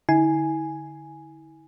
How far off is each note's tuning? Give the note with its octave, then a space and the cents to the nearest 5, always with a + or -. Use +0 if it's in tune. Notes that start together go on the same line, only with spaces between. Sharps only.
D3 +0 E4 -40 G#5 +0